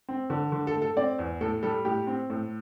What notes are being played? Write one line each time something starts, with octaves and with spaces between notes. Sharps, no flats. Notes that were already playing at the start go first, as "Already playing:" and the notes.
C4
D3
D3
A4
A3
A4
C4 D5
E2
A2 A4
G3 A4
A2 G4
C4
A2